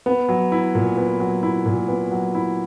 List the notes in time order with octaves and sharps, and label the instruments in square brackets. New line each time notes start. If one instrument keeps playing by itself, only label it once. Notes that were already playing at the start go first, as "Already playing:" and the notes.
[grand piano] B3
F#3
E4
A#2
B3
F#3
E4
A#2
B3
F#3
E4